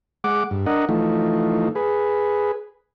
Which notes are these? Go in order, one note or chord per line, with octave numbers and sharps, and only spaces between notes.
G#3 F#5 D6
G2
D4 A#4 D#5 F#5
E3 F3 A3 D#4
G#4 B4